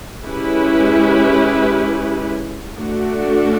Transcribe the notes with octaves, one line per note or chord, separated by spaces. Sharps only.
G#3 C#4 E4 G4 B4
A3 D4 F#4